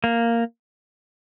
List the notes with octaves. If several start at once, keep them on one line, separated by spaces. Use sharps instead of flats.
A#3